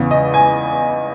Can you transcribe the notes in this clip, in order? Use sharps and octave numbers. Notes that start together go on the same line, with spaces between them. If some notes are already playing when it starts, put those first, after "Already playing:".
Already playing: E2 C#3 E3
D#5
G#5